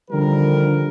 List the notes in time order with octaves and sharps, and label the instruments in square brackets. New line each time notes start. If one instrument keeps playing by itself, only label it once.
[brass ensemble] D3 D#3 F3 G3 A#4